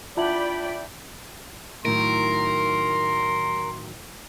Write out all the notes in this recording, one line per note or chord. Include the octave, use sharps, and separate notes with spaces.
D4 E4 F4 D5 F#5 G5 B5 F#7
A2 D#3 F#3 A#4 C6